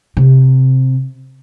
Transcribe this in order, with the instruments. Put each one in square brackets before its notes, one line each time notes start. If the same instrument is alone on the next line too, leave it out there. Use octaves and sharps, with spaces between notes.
[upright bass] C3